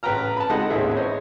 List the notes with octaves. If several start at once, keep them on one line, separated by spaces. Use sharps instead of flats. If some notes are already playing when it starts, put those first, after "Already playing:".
A1 C#3 B4 G5 A#5 F6
A5 B5
G#3 C4 D#4 A4 D#5 F#5
A1 D#2 C#3 E4 G#4 E5
C5 C#5 D#5